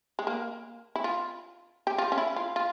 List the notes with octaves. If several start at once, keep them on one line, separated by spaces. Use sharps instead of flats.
G#3
A#3
E4
F4
G4
F4
C#4
E4
F4
F4